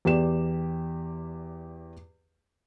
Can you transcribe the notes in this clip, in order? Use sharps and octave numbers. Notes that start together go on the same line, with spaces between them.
E2 G4 D5 E7